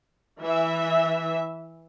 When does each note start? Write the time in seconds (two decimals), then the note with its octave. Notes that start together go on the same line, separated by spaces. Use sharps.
0.40 E3 E5